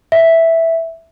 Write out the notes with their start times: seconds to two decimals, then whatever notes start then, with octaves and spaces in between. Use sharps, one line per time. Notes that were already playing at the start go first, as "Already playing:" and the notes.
0.12 E5